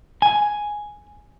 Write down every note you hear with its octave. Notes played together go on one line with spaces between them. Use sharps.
G#5